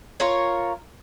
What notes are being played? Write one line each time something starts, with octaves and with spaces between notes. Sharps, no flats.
F4 A#4 C#5